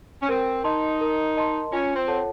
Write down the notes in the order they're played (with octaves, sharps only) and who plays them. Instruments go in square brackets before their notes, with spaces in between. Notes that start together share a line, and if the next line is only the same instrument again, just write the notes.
[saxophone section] C#4
[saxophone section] C4 [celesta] A#4
[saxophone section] D#4 [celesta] D#5 A5 C6
[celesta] A#4
D#5 A5 C6
[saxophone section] C#4 [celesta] F4
[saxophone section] C4
[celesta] A4 C#5 F#5 A5